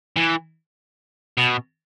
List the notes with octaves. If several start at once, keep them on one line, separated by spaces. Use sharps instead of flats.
E3
B2